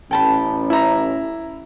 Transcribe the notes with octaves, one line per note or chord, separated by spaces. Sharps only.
A1 C#4 G5 A5 B5
E4 A#5